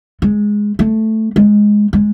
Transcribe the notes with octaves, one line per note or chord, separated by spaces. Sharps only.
G#3
A3
G#3
G#3